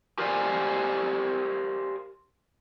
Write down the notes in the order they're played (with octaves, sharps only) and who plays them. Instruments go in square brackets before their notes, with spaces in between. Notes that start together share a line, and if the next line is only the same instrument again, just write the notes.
[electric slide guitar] G4 A#4 C5 D5 F5 G#5